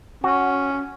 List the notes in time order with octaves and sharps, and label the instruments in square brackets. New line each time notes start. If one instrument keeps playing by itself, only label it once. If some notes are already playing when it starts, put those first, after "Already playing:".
[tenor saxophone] C#4 [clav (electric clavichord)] F#4